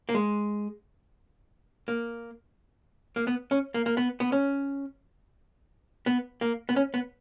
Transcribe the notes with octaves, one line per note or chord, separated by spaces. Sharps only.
A#3
G#3
A#3
A#3
B3
C#4
A#3
A#3
B3
B3
C#4
B3
A#3
B3
C#4
B3